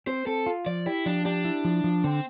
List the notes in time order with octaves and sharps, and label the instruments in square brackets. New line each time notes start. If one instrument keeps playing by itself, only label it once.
[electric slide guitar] C4 [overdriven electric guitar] C5
[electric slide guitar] C4 [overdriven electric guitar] A4
[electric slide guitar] F4
[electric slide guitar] F3 [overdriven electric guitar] D5
[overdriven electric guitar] E4 [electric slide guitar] G4
[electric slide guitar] F3 [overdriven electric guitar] D4
[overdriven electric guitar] D4 [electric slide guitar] G4
[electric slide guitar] E4
F3
F3
[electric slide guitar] D3 [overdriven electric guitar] C4